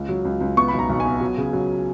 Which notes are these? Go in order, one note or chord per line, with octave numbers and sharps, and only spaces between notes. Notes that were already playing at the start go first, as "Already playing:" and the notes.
Already playing: C#2
F#3
C#2
C#2
B3 C#6
B1 B5
A#5
B1
G#5
B3
F#3
C#3
F#3